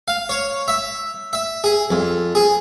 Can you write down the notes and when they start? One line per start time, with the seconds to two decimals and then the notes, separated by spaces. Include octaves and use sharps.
0.08 F5
0.29 C#5
0.68 E5
1.33 E5
1.64 G#4
1.91 F2
2.35 G#4